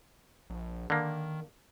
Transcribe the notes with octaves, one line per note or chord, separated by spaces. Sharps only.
A#1
D3 D#3 A#3